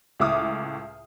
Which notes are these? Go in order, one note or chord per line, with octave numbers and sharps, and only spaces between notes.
C#2 A2 E5 D6 D#6 F6